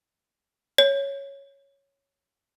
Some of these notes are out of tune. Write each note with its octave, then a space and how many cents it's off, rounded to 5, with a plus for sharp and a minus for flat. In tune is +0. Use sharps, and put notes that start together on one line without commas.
C#5 +0